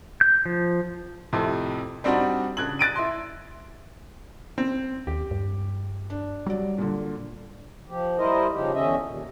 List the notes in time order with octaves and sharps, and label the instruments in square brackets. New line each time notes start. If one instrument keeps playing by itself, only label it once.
[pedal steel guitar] G6
F3
[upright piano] F2 A2 C3
G3 C4 D4 D#4 F#4
C#3 D4 F#6 G#6 F#7
F#6 A6 D7 D#7
E4 C6
[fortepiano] C4
[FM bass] D#2 [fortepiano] G4
[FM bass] G2
[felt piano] D4
[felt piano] F#3 D5 [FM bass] G3
[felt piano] A#2 D3
[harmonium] F3 G4
G3 E4 A#4 C5 D#5
C#3 F3 D#4 G4
E2 D3 C#4 D#5 E5
D#2 A#2